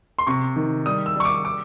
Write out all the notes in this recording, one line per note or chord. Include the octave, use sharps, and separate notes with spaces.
C6
C3 C#6
D#3
G3 D#6
E6
G3 C#6
D6
D6